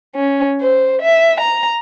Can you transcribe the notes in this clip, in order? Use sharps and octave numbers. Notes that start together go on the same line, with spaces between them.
C#4
C5
E5
A#5